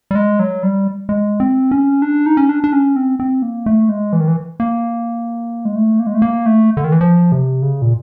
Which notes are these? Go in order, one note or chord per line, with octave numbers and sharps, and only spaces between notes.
G3
G#3
F#3
G3
G#3
C4
C#4
D4
D#4
C#4
D4
D4
C#4
C4
C4
A#3
A3
G#3
E3
D#3
E3
A#3
G#3
A3
A#3
G#3
A3
A#3
A3
D3
D#3
E3
F3
C3
C#3
A#2